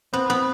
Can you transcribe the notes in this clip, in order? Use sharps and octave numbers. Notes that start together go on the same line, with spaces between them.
B3 C4
B3